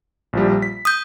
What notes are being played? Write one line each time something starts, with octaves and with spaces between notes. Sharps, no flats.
A#1 F3 G3
B6
D#6 G6